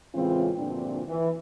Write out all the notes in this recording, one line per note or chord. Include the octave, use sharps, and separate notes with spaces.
A2 C#3 E3 G#3 C4 F4
D2 G2 A#2 F3 C4 D4
E3